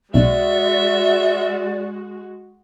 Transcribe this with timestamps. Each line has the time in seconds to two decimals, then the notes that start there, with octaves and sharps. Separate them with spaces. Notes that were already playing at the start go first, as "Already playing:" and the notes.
0.14 B1 G#3 F#4 D5 E5